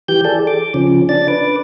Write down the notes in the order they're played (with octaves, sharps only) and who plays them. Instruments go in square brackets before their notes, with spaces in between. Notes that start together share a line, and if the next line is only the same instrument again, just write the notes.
[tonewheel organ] E3 G4 G6
G#4 A4 D5
D6
C#3 F3 C#4
D4 D5 A6
B4 D6